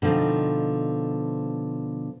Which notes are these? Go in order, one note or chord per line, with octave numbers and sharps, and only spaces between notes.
B2 D3 F3 C4 D#4